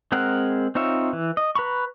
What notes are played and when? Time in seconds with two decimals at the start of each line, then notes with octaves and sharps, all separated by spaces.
0.12 G#3 C4 G#4 A#4 F#5
0.75 C4 D#4 F4 C#5 E5
1.13 E3
1.37 D#5
1.55 B4 A#5 B5 C#6